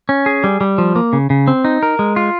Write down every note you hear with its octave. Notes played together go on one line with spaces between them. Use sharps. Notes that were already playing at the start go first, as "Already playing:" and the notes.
C#4
G#4
G3
G3
F3
A#3
C#3
C#3
C4
D#4
A#4
G#3
F4